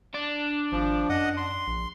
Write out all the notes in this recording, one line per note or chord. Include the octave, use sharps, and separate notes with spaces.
D4
G#1 F3
F#2 D#5 F#5 D#6
C6
A#1